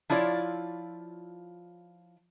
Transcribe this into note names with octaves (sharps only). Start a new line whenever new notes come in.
F3 E4 F4 C#5 D5